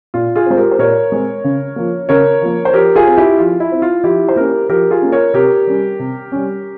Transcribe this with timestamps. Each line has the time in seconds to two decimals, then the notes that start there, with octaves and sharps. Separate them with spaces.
0.14 A#2 F4
0.36 F4 G#4
0.46 G#3 C4 C5
0.57 G4 A#4
0.71 C5
0.79 A#2 A#4 C#5
1.12 G#3 C4
1.44 C#3
1.76 F3 A#3
2.09 C#3 A#4 C#5
2.41 F3 A#3
2.65 C5
2.74 F3 G4 A#4
2.95 F4 G#4
3.07 C4
3.17 E4 G4
3.39 F3 F4
3.60 E4
3.72 C4
3.82 F4
4.04 F3 E4 G4
4.29 C5
4.36 A#3 C#4 G4 A#4
4.69 F3 G4 A#4
4.91 F4 G#4
5.02 A#3 C#4
5.12 A#4 C#5
5.34 C3 G4 A#4
5.67 G3 C#4
5.99 C3
6.32 G3 C#4